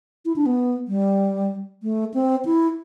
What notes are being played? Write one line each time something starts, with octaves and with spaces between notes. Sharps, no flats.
E4
D4
B3
G3
A3
C4
E4